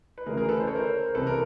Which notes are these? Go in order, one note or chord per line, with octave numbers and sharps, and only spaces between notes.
B4
D2 C#3 E3 G#4 A#4
G#4 A#4
A4 B4
C5
C#5
A#4 C5
C2 C3 E3 A4 B4
A#4